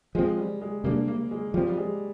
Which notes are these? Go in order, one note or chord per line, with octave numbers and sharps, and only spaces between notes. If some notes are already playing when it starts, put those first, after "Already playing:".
F3 G#3 C4
G3
G#3
C3 G3 A#3 D4
A#3
G#3
F3 G3 C4
G3
G#3